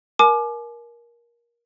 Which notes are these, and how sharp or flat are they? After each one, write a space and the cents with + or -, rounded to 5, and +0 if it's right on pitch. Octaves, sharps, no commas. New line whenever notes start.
A#4 +20 G#5 +45 D6 +25